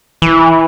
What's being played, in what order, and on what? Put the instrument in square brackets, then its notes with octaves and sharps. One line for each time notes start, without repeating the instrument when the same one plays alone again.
[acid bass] E3